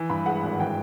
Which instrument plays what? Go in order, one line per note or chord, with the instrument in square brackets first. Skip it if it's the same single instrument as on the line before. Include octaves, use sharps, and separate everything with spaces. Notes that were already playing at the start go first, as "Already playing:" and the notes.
Already playing: [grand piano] E3
[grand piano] G2 [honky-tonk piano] B5
[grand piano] G#3 [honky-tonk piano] F#5
[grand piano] G#1
[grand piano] E3 [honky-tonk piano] G5